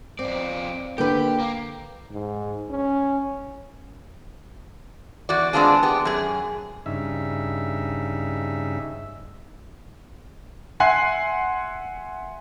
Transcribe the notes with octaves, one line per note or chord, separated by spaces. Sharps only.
F2 C4 D5
D3 A#3 G4 B4 G5
A#3
G#2
C#4
E2 F#4 D5
G#3 B3 C4 D4 F4 G#4
B3 G4
F#2 G#4
G2 C#3 D#4 E5
E5 F#5 G#5 C6 F#6 C7